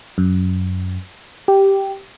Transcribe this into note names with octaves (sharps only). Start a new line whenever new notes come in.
F#2
G4